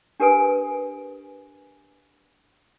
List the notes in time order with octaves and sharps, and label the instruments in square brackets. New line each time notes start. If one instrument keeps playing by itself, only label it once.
[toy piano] D4 G4 A#4 B4 G#5 D#6